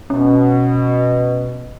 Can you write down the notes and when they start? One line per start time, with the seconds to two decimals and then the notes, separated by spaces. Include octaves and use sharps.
0.10 B2 C#4